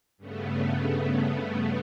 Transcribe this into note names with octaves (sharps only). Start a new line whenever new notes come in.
G2 C#3 A3 B3